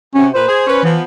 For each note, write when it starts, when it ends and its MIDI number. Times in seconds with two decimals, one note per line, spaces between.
0.15 0.29 48
0.15 0.28 61
0.15 0.29 66
0.34 0.44 46
0.34 0.44 71
0.34 0.79 72
0.47 0.65 68
0.66 0.82 61
0.66 0.82 71
0.83 0.98 52
0.83 1.02 53
0.83 1.02 59